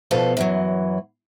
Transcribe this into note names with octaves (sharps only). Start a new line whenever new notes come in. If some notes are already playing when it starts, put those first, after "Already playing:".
B2 F3 F4 A4 B4 F5
F#2 E3 F#3